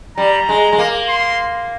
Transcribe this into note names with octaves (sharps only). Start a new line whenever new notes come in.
G3 A#5
G#3
G#3
A#3
C6